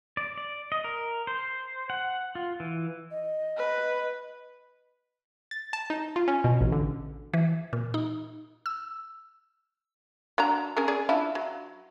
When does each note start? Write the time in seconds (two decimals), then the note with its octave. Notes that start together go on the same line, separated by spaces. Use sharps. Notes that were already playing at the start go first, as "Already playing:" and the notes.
0.17 D5
0.38 D5
0.72 D#5
0.84 A#4
1.27 C5
1.90 F#5
2.35 F4
2.60 E3
3.11 D#5
3.57 B4
5.51 A6
5.73 A5
5.90 D#4
6.16 F4
6.28 C#4
6.44 B2
6.61 A1
6.72 D3
7.34 E3
7.73 A#2
7.94 D#4
8.66 E6
10.38 F#3 D4 A#5
10.77 C#4 G#4 A#4
10.88 C#4 G#4 D5
11.09 D4 E4 F4
11.35 F#3